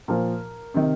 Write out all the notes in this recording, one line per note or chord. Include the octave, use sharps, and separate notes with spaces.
A#2 F3 A#4
C3 D#3